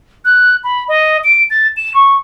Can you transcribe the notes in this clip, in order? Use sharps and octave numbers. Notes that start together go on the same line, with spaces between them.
F#6
B5
D#5
D7
A6
E7
C#6